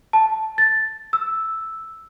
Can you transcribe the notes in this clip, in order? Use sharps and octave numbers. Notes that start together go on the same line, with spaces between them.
A5
A6
E6